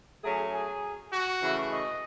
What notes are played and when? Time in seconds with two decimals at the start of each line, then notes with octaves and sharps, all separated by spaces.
0.24 F#3 A3 C#4 G#4
0.53 G#4
1.11 F#4
1.40 C#3 E3 A3
1.70 D#5